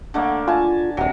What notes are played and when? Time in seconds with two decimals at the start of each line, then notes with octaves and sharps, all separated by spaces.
0.14 D3 A3 A#3
0.48 F4 G#5 A5
0.97 D#1 C3 F#3